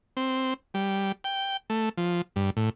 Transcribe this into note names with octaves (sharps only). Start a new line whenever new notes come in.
C4
G3
G5
A3
F3
G2
A2